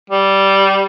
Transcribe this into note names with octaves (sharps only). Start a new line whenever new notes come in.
G3